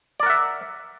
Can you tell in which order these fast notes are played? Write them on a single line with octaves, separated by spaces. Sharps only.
D5 A#4 F#5 E5